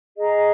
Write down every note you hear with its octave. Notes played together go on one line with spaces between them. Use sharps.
G#4 D#5 A#5